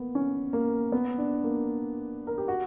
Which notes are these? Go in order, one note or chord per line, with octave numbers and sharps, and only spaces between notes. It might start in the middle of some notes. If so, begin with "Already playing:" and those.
Already playing: A#3 B3
C#4
A#3
B3
D4
A#3
A#4
G4
F#4